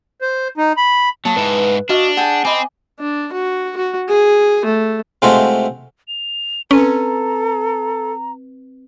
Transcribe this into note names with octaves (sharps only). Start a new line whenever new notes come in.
C5
D#4
B5
F#3 A#3 A5 D#6
G#2 E4 B4
D4 F#4 D5 D#5 F5
G#4 F#5 G5 A5
C4 D#5 G#5 B5 D6
D4
F#4
F#4
G#4
A3
C3 G#3 A3 F4 F#4 C5
F7
C4 C#4 A4 B4 A#5